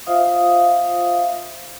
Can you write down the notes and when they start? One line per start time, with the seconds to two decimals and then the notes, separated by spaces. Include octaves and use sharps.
0.07 F4 C5 E5 F5 D#6